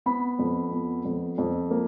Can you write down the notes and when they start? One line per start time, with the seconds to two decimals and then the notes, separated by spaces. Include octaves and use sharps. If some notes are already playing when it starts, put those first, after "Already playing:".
0.06 B3 B5
0.39 F2
0.72 B3
1.05 F2
1.38 F2
1.71 A#3